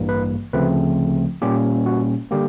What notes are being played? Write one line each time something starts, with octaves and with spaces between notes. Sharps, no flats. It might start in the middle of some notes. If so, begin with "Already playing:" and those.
Already playing: A1 G2 E3 G3 A#3
B4
D2 C#3 F3 A3 C4 B4
A#2 G3 A#3 C#4 G4
F#4
D3 G3 A#3 G4